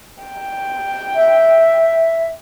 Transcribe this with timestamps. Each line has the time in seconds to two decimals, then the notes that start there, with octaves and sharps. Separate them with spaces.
0.23 G5
1.15 E5